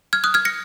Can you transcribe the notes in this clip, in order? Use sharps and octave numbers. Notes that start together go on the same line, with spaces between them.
F6 G#6
D#6 F#6
F6 G#6
A#6 C#7